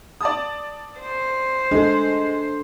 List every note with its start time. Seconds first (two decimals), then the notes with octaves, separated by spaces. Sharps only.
0.21 D5 A5 D#6
1.00 C5
1.71 G#3 D4 A4